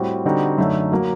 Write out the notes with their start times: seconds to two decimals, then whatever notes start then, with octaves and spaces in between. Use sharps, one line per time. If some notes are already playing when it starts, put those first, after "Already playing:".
Already playing: A2 G3 C4 F#4
0.25 D3 G3 C4 D#4 F#4
0.58 F#2 D3 A3 D#4
0.92 F#3 A#3 F#4